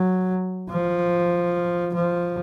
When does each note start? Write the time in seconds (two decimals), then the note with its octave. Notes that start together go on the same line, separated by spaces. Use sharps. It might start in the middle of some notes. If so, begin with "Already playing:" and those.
Already playing: F#3
0.69 F3
1.94 F3